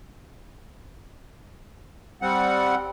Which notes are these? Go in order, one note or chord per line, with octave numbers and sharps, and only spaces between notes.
G3 C4 F#5